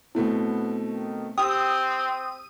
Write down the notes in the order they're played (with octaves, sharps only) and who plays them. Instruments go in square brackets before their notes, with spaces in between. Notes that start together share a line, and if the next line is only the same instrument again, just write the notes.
[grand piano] B2 A3 C4 [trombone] B3 [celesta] E4
[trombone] D#3
[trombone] C4 [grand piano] G4 E6 [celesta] G5 [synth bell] D#6